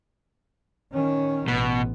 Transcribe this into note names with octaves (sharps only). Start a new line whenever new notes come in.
D#3 C#4
A1 B2 B3